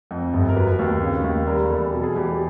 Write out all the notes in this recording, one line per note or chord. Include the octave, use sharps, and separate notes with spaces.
F2
G1
A#4
F#3 B4
D#2
C#3
D#2
G3 A#4
E2 A4
B2 A4
G#4
E2 G4
G4